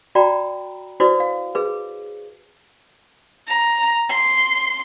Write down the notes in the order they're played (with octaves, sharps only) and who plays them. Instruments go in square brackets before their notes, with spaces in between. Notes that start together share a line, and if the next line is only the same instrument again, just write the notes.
[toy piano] F#4 D5 G5 A#5 B5
E4 F#4 B4 C5 D5 D#6
F5
G#4 B4
[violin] A#5
C6